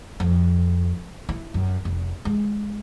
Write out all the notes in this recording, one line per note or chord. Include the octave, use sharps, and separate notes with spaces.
F2
E4
F#2
F1
G#3